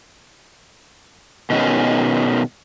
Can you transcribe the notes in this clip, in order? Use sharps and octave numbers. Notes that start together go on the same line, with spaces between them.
B2 D#3 G#3 C#4